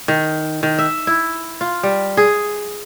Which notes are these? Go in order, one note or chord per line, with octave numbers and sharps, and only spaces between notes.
D#3
D#3
E5
E4
F4
G3
G#4